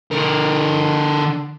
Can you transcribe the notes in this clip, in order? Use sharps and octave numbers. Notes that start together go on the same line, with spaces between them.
D3 A#4